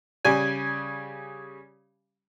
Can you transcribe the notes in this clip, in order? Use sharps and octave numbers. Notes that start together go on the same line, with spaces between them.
C#3 G3 G#5